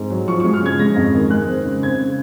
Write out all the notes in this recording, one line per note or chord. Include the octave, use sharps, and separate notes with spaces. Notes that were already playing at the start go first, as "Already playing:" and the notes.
Already playing: G#2 C4
F#3
F3 C#6
C#6
G#3
F6
C#3 G#6
G#3 A#6
F2
D#3
G#3 F#6
C4
C#3
C4 G#6
C#3